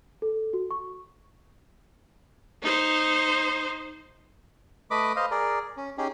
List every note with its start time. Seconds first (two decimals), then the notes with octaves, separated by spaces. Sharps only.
0.22 A4
0.53 F#4
0.71 C#6
2.63 D#4 C5
4.91 A3 B4 D#5 B5 D6
5.16 C5 D#5 F5
5.31 G#4 A#4 D5
5.77 C#4
5.98 C#4 D#4 G4 G#4